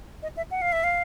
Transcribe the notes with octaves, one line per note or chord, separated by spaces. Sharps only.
D#5
E5
F#5
F5
E5
F5